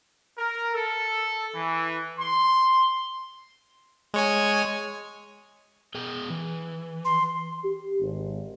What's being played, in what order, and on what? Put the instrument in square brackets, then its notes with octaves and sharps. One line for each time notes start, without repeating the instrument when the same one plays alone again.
[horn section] A#4
A4
E3
C6
[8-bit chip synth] G#3 C#5 G#5
[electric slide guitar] B3 G#4 G5
E3
[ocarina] C6
[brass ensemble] G4
G#1